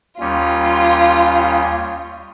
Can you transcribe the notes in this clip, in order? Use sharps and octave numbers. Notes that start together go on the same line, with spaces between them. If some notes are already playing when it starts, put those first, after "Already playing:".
D#2 G3 C#4 F4